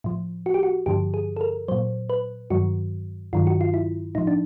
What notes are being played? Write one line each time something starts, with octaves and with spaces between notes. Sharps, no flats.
A2 F3
F#4
G4
F#4
G2 D3 F3 G4
G#4
A4
A#4
A#2 F#3 C5
B4
G2 D#3 F#3 F#4
G2 D#3 F#3 F4
F#4
F4
E4
A2 F3 D#4
D4